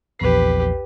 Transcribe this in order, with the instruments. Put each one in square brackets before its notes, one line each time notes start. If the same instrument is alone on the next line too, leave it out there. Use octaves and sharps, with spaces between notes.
[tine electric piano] A#1 E2 C7 [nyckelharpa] G4 B4